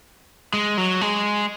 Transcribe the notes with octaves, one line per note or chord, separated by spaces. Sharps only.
G#3
F#3
G#3